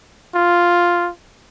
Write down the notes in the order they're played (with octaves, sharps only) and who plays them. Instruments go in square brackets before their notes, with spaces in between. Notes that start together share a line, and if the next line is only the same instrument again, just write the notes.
[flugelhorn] F4